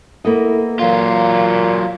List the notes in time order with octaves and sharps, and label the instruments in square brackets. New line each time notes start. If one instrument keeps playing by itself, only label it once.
[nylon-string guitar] A#3 B3 D#5 [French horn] E4 [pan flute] A4
[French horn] A#2 [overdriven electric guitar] F#3 F4 [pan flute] F5